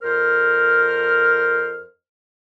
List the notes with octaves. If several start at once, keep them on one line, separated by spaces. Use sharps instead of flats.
F2 A#4 C5 F6